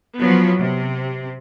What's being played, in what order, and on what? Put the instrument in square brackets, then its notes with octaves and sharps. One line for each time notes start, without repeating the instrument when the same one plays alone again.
[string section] F3 F#3 B3
C3